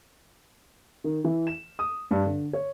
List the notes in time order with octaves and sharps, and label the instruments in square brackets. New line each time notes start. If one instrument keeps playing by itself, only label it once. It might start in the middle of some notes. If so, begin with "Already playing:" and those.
[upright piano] D#3
E3
E7
D#6
G2
D3
C#5